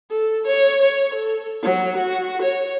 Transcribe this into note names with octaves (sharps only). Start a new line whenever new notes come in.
A4
C#5
C#5
A4
F#3
F#4
C#5